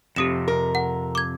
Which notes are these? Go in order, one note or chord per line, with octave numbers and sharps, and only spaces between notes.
F2 C3 G4 D#6 E7
A#4
F#5
D6 G#6